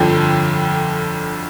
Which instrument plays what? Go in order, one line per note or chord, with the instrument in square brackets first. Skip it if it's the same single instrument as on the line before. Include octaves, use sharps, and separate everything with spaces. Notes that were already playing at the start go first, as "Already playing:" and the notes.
Already playing: [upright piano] G1 F2 D3 F3 G5